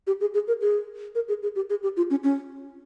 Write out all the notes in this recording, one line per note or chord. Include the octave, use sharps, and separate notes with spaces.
G4
G#4
G#4
A#4
G#4
A#4
G#4
G#4
G4
G#4
G4
F4
C#4
C#4